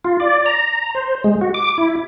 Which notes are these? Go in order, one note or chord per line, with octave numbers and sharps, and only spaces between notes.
F4
D5
A#5
C5
G#3
F#4
D6
E4